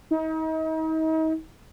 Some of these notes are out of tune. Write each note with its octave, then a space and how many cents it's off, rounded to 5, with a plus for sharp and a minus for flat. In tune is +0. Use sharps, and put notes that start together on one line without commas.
D#4 +35